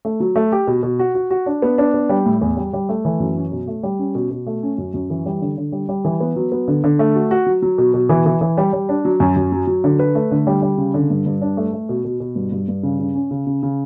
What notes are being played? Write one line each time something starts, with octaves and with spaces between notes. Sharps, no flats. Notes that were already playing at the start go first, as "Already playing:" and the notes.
A3
F#3
A3
G4
B2
B2
F#4
F#4
F#4
D4
B3
D4
B3
G3
A2
E2
G3
G3
A3
E3
F#2
C#4
B2
A3
G3
C#4
B2
B2
A3
C#4
F#2
F#2
E3
G3
D3
D3
G3
G3
E3
B3
F#3
B3
D3
D3
A3
F#4
F#4
F#3
F#3
B2
B2
E3
E3
E3
G3
G3
D4
F#3
F#2
F#2
F#3
F#3
D3
B4
A3
D3
G3
G3
C#3
D3
G2
G2
D4
A3
A3
B2
B2
B2
G2
G2
G2
C#3
C#3
C#4
C#3
C#3
C#3